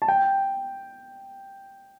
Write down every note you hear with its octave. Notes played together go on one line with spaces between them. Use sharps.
A5
G5